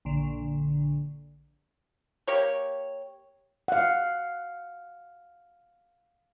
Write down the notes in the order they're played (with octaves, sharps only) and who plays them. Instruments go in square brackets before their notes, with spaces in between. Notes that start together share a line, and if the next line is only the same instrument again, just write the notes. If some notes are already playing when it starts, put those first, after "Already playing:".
[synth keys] A#1 D3
[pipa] A#3 G4 C#5
[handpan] F5 F#5